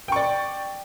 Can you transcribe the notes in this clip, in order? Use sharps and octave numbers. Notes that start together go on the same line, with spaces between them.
D5 G5 C#6